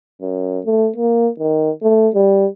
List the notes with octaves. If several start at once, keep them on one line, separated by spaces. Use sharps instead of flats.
F#2
A3
A#3
D#3
A3
G3